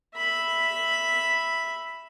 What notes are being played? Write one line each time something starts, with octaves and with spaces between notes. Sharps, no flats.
E5 B5